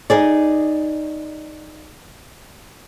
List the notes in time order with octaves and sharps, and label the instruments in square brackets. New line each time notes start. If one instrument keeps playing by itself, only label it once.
[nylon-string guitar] D#4 G#4 D5